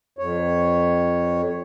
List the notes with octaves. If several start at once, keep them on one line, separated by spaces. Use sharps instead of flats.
F2 C#5